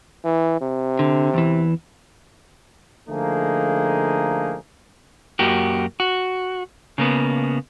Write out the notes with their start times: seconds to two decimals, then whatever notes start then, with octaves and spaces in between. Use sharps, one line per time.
0.25 E3
0.61 C3
0.99 D3
1.34 E2 E3
3.09 D3 F3 A3 A#3 D#4 G#4
5.39 F#2 A#3 F#4 G4
6.00 F#4
6.98 C#3 A#3 B3